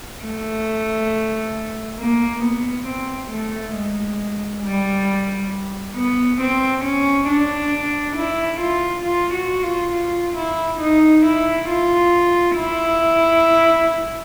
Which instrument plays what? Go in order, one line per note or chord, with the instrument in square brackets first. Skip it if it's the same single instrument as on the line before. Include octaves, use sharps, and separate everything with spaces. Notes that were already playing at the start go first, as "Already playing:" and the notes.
[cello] A3
A#3
B3
C4
A3
G#3
G3
B3
C4
C#4
D4
E4
F4
F4
F#4
F4
F4
E4
D#4
E4
F4
E4